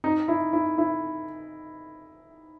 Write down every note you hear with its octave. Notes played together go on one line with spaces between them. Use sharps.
D#4
E4
E4
E4